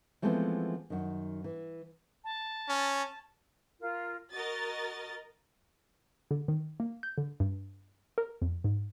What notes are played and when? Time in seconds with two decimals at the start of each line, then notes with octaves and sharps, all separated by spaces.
0.22 E3 F3 G#3 A3 B3 C4
0.90 F#2 D#3
1.44 E3
2.24 A5
2.69 C#4
3.80 F4 A#4
4.32 F#4 A#4 D#5 A6
6.31 D3
6.48 D#3
6.80 A#3
7.03 G6
7.18 D3
7.40 G2
8.18 A#4
8.42 F2
8.64 G#2